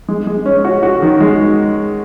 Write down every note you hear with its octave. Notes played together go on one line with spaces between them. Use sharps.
G#3
G#3
C#4
F#4
F#4
D#3
G#3